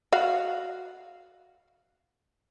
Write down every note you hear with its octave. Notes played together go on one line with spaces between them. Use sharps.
F#4 F5